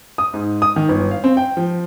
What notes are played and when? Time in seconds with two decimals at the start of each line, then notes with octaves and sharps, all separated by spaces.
0.18 D#6
0.34 G#2
0.62 D#6
0.76 D#3
0.89 G1
1.11 F5
1.24 C4
1.37 G5
1.57 F3